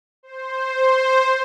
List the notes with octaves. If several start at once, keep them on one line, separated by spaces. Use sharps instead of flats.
C5